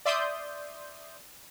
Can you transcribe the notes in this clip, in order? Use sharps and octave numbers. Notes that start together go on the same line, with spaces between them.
D5 E5 C6 D#6 G6